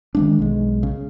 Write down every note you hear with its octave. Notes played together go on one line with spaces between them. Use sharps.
D#3 G#3 D4
B1 G#3
C#3